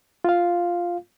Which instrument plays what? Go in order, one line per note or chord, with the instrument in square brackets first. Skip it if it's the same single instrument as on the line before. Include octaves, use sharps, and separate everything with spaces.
[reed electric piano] F4 F5